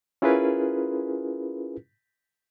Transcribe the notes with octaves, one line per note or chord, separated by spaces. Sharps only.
C#4 E4 F4 G#4 A#4 B4